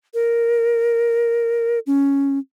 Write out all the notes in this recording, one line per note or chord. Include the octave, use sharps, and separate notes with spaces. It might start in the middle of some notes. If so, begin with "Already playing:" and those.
A#4
C#4